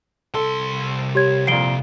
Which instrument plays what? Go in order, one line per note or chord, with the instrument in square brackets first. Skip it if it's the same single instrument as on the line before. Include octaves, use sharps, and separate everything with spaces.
[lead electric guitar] C2 C6 [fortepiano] A4
[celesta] G4 C#5 G#6
[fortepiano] F2 A#2 [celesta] C7 D7 G7